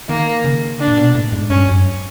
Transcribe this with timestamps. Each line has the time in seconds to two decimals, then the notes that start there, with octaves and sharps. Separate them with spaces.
0.09 D#3 A#3
0.44 C#3
0.80 D4
0.88 A#2
0.97 B2
1.15 A2
1.32 G#2
1.50 G2 C#4
1.68 F#2